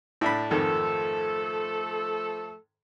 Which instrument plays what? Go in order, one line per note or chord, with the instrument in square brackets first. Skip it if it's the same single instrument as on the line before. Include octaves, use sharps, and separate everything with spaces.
[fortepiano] A2 D4 B5
[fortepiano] F2 G#2 D#3 [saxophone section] F3 A3 A4